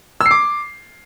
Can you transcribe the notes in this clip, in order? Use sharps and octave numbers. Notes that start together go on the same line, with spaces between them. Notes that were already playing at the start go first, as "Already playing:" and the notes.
E6
C7
D6